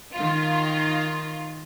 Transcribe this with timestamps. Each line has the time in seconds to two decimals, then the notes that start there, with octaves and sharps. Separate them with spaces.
0.14 D#3 F4